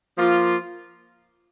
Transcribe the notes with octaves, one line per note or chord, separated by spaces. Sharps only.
F3 A#3 F4